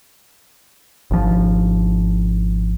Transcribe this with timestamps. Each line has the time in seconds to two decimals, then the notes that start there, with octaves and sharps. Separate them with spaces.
1.11 G#1 F3